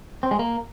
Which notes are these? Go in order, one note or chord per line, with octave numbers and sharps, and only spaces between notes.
C4
G#3
A#3